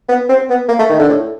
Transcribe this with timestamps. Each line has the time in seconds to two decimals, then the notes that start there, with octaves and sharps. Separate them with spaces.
0.09 B3
0.29 C4
0.50 B3
0.68 A#3
0.79 A3
0.89 D#3
0.99 D3
1.09 A2